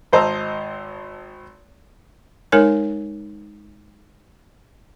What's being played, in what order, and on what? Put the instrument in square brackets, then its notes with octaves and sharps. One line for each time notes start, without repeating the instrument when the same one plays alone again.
[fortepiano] G#1 C5 D#5 A5 A#5 E6
[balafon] G#3 D#4 A#4 C#5 G#5